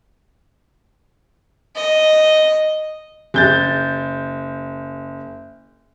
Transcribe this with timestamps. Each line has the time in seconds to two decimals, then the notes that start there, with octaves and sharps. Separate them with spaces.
1.76 D#5
3.34 F#1 G6 A6